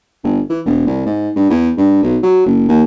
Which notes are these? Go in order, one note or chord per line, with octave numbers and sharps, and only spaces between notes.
G1
E3
E1
C2
G#2
G2
E2
G2
B1
F#3
F#1
D#2